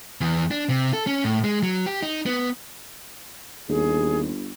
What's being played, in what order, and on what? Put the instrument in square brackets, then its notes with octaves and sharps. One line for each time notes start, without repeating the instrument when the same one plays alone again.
[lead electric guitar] E2
D4
C3
A4
C#4
A2
G#3
F#3
G4
D#4
B3
[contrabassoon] G1 [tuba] D#2 [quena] G#4